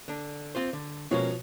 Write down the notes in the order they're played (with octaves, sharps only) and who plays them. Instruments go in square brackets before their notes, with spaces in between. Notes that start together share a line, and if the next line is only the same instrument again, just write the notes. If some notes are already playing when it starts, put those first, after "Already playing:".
[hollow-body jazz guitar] D3 D4
C4 F4 C5
D3
[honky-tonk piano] B2 F3 C#5 [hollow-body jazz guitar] G#3 A#3 C#4